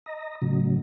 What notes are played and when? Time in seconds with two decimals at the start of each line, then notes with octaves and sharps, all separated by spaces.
0.06 D#5 A#5
0.42 A2 C#3 F#3